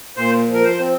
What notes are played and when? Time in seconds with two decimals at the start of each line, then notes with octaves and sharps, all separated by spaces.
0.17 A#2 C5
0.48 F3
0.54 A#4
0.64 C5
0.80 C4